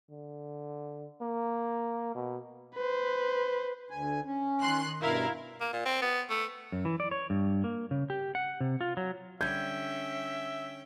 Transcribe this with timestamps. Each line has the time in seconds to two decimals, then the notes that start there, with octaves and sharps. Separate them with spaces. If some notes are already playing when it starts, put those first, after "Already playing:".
0.11 D3
1.21 A#3
2.15 B2
2.75 B4 C5
3.90 D2 G#5
4.26 C#4
4.60 D#3 C6 F#6
5.01 G2 B2 E4 A#4 F5
5.61 A#3
5.73 A#2
5.85 C4
6.02 B3
6.30 A3
6.72 F#2
6.85 E3
7.00 D5
7.11 C#5
7.30 G2
7.64 A#3
7.91 C#3
8.10 G4
8.35 F#5
8.60 C3
8.81 F4
8.97 F#3
9.41 D3 G3 C#4 E5 G5 G6 G#6